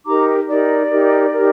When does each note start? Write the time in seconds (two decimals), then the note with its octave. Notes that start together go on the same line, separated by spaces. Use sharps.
0.05 D#4 G4 A#4 A#5 D6
0.47 D#4 G4 A#4 D5
0.90 D#4 G4 A#4
1.34 D#4 G4 A#4